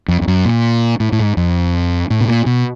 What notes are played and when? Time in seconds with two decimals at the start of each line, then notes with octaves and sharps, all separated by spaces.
0.08 F2
0.21 F2
0.28 F#2
0.45 A#2
1.00 A2
1.12 A2
1.19 G#2
1.37 F2
2.10 A2
2.21 B2
2.28 A#2
2.46 B2